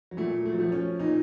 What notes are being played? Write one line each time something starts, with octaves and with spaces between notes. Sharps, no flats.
F#3
A#2 A3
A3
F#3
F3 A3
C#4
A#2 D#4